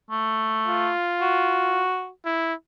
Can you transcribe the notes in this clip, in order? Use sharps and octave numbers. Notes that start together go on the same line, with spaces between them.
A3
F4
F#4
E4